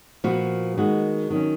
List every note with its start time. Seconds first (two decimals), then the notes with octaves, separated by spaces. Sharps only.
0.24 A#2 F3 B3 F#4
0.77 D#3 G#3 B3 F#4
1.30 D#3 F#3 C#4